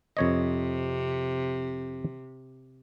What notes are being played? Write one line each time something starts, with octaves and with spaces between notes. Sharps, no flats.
F2 C3 C#5 D#5